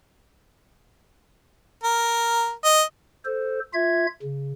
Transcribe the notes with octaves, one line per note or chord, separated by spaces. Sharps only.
A#4
D#5
A4 C5
F4 E5 G#6
C#3